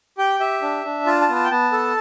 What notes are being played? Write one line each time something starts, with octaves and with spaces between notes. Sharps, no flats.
G4 G5
G4 E5
D4
D4
F4 A5
A5
B3
A5
G5
B3 A5
A4